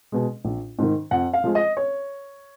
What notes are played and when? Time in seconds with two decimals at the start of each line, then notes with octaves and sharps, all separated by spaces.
0.12 B2 G#3
0.45 A#1
0.79 G#2 D#3
1.11 F2 F#5
1.33 F5
1.44 F3 G#3
1.55 D#5
1.77 C#5